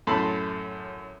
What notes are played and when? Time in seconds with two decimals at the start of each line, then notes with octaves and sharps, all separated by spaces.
0.07 F#2 A2 A4 A5 B5 C6